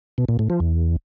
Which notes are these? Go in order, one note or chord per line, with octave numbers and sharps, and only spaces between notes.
B2
A#2
A2
F3
E2